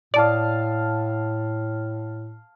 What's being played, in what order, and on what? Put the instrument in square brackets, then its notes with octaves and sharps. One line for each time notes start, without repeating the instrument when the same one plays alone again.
[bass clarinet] A2 [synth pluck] D5 [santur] F5 A5 D#6